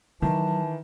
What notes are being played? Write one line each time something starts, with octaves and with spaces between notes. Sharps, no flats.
D#3 E3 F#3 A5